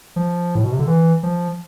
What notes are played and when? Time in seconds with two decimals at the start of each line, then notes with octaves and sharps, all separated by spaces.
0.16 F3
0.55 A2
0.64 B2
0.72 C3
0.79 D3
0.88 E3
1.23 F3